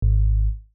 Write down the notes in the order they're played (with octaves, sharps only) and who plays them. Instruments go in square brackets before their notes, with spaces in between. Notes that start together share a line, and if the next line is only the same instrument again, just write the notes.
[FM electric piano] G#1